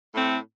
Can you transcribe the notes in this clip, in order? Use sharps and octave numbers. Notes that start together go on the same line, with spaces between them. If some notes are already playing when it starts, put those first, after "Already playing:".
A2 A3 C4